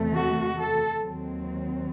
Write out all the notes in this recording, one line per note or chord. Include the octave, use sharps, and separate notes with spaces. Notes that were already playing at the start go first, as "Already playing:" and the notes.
Already playing: E2 C3 D#3 A3
F#4
A4
D#2 D#3 F#3 C4